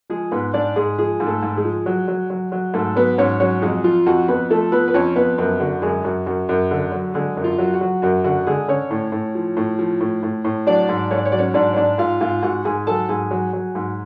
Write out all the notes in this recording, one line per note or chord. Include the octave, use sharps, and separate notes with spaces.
F3 G#3 G#4
G#2 B3 B4
G#2 D4 D5
G#2 G#3 G#4
F3 G#3 G#4
G#2
A3 A4
G#2
G#3 G#4
F3
F#3
F#3
F#3
F#3
G#2 A3 A4
F#3 B3 B4
G#2 C#4 C#5
F#3 C#4 C#5
F2 G#3 G#4
F3 F4
F2 F#4
F2 B3 B4
F3 A3 A4
F3 B3 B4
B4
F2 C#4 C#5
F2 B3 B4
F#2 B3 B4
D3 F#4
F#2 G#3 G#4
F#2 F#4
F#2 F#4
F#2
D3
F#3
D3 G#3 G#4
F#2
F4
F#3
F#4
F#3
F#2 F#4
D3 F#4
D3 G#3 G#4
D3 C#4 C#5
A2
A2
F3
A2
F3
A2
A2
A2
F#3 D4 D5
G#2
G#2 C#5
D5
C#5
F#3 D5
C#4 C#5
G#2 D4 D5
C#5
G#2 D4 D5
G#2 F4 F5
G#2 F4 F5
G#2 F#4 F#5
G#2 G#4 G#5
F#3 A4 A5
G#2 G#4 G#5
F#3
F#3
G#2